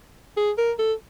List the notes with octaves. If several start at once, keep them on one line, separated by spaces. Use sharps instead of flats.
G#4
A#4
A4